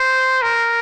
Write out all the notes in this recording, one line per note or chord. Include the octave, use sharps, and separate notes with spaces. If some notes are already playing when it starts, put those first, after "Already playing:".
Already playing: C5
A#4